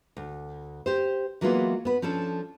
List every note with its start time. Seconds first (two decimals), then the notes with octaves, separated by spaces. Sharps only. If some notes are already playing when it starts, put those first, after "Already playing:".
0.17 D2
0.86 G4 C5
1.41 E3 F#3 G#3 A#3 B3 F4
1.85 B3 B4
2.02 F3 C#4 D4 A4